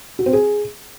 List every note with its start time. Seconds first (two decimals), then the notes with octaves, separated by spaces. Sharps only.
0.19 F#4
0.26 C4
0.33 G#4